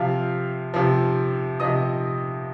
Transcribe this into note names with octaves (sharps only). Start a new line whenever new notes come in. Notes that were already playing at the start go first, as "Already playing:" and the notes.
Already playing: C3 F3 F5 F6
C3 F3
C3 F3 D#5 D#6